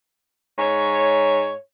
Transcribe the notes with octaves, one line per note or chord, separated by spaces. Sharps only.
G#2 C#5